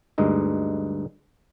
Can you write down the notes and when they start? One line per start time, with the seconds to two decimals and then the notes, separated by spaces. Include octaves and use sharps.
0.18 D2 G2 G#3 D#4